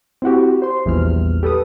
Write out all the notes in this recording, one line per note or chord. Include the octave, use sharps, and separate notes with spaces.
C4 E4 F#4 G4
C5 C6
A#1 E2 G3 F6
G4 A4 B4 D#6